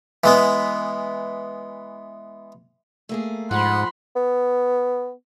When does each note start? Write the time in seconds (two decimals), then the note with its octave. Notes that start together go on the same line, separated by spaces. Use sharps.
0.24 E3 G#3 B3
3.09 A3 A#3 G#4
3.51 G#2 F3 F#5 B5 C6
4.16 B3